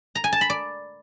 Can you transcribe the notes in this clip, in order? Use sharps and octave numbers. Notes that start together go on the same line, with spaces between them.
A#5
G#5
A5
B5
D5